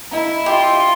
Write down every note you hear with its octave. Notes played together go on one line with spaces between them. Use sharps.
E4 D#5 F5 A#5
F4 G4 D#5 G#5 C6 D6